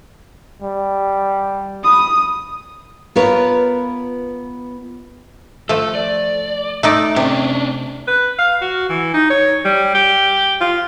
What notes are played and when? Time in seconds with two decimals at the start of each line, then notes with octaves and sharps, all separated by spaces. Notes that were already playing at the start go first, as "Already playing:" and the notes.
0.62 G3
1.85 B5 D#6
3.16 B3 F4 A#4 B4 C#5
5.69 F3 A3 A4
5.95 D5
6.83 A3 D#4 D5
7.16 C3 C#4 D4
8.08 B4
8.39 F5
8.61 F#4
8.89 E3
9.14 D#4
9.30 C#5
9.65 G3
9.95 G4
10.61 F4